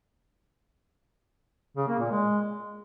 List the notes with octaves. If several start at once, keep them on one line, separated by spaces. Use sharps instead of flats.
C#3
A#3
A#2
G#3